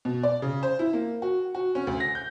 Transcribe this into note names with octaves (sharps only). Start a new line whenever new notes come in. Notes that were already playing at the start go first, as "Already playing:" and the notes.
B2
D5
C#3
C5
E4
A#3
F#4
F#4
C#4
D2
A#6
G6